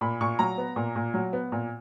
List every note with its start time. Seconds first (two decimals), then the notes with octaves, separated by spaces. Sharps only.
0.01 A#2 B5
0.21 A#2 C#6
0.39 F#3 A#5
0.58 B3
0.76 A#2
0.96 A#2
1.14 F#3
1.33 B3
1.52 A#2